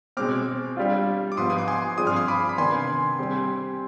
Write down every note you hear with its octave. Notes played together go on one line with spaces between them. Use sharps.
B2 G#3 C4 D6 F6
G3 D4 F4
D6
G#2 F3 B3 C6 D#6
D#6
D6
G#5 C6
G2 F3 C4 F4 G#4 D#6
F6
C6 D#6
B5 D6
B5
C3 D#3 B3 D4 G#5 C6
G3 C4 G4